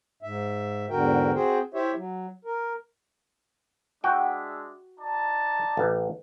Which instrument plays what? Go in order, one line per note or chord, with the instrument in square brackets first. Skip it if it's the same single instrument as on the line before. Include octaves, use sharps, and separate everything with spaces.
[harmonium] G#2 E5
E2 G#2 D3 F#4 A#4 G5
C4 F#4 G#4 C5 G5
E4 G4 C5 C#5 E5
F#3
A#4
[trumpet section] G#3 D4 E5 [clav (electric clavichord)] F#4 G5
[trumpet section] D#4 D5 A5
[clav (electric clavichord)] A1